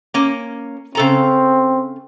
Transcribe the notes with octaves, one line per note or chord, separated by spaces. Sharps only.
A#3 C#4
C#3 C4 A4 A#5